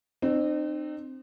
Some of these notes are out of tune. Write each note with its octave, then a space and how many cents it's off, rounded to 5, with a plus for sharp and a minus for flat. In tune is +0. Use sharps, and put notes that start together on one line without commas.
C4 +0 D#4 -40 A4 +0